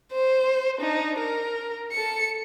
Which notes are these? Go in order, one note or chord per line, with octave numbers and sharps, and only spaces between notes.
C5
D4 D#4
A#4
A4 C#7